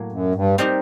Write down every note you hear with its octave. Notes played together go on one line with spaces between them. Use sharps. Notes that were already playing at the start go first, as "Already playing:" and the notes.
Already playing: A2 F#3 A#3
F#2
G2
G3 C4 D#4 G4 A#4